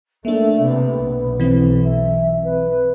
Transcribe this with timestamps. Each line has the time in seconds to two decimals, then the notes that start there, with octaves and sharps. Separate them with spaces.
0.25 A3 A#3 D4 E5
0.62 C3 B3
1.04 B1
1.40 E3 C4
1.84 E5
2.44 B4